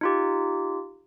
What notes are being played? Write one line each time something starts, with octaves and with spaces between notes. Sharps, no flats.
D#4 F4 G4